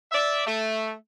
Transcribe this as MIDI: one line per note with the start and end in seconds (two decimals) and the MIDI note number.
0.12 0.43 74
0.12 0.43 76
0.46 0.93 57